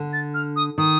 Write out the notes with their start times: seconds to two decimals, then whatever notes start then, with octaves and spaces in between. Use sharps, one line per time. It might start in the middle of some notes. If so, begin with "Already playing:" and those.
Already playing: D3
0.13 A6
0.34 F6
0.56 D#6
0.78 D#3 D#6